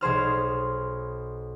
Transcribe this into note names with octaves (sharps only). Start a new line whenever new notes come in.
B1 G#4 C5 F6